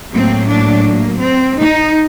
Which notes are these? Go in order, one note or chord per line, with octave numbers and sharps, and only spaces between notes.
A2 F#3 A#3 C4
D4
A#3
C4
D#4